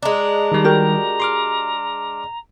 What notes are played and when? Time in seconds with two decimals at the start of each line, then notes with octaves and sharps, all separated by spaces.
0.03 G#3 D4 A#5
0.52 D#3 G3
0.64 F#4 G4 A#4
1.20 C6 D6 F6